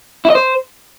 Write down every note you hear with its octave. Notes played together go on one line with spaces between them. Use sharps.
E4
D#5
C5